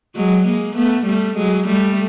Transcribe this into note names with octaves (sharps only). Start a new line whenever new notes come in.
F#3 G#3
G#3 A#3
A3 B3
G3 A3
F#3 G#3
G3 A3